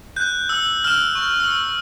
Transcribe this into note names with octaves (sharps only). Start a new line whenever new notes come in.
F#6 G6
E6
F6 E7
C#6
E6